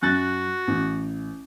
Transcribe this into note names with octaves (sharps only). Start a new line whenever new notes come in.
F#2 F#4 F#6 A6
A1